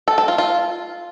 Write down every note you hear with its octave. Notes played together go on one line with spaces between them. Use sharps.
A4
A4
F4
F4